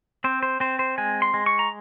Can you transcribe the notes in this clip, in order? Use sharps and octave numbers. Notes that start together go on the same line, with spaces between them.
C4 C5
C5
C4 C5
C5
G#3 G#5
C6
G#3
C#6
A#5